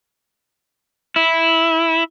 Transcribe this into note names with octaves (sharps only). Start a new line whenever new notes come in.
E4